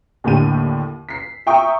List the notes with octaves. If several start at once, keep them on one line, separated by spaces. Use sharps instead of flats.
D#2 A2 D3 G4 D#7
B6 C7
E5 G5 A#5 C#6 D#6